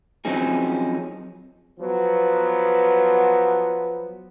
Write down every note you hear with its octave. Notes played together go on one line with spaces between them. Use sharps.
F3 F#3 C4 C#4 D#4 G#4
F3 F#3 B3